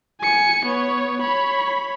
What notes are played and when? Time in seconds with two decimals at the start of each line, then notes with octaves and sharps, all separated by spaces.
0.21 G#5 C#7
0.65 B3 C#5
1.21 C#5 B5